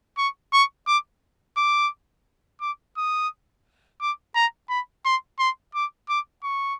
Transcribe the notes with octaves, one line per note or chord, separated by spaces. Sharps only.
C#6
C#6
D6
D6
D6
D#6
D6
A#5
B5
C6
C6
D6
D6
C#6